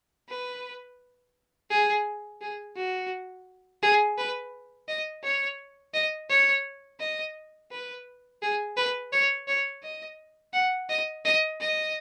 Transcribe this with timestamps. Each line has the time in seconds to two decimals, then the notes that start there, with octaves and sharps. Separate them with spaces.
0.29 B4
1.70 G#4
2.41 G#4
2.76 F#4
3.82 G#4
4.18 B4
4.88 D#5
5.23 C#5
5.94 D#5
6.29 C#5
7.00 D#5
7.71 B4
8.42 G#4
8.77 B4
9.12 C#5
9.48 C#5
9.83 D#5
10.53 F#5
10.89 D#5
11.25 D#5
11.60 D#5